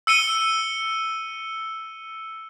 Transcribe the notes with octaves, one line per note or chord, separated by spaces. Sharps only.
E6 C#7 D#7 G7